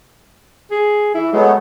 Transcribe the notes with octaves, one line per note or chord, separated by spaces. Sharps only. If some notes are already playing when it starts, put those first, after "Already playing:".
G#4
E3 E4
F#3 G#3 A3 B3